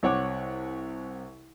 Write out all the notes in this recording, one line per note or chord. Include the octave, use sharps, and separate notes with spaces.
C2 C#5 F#5 D6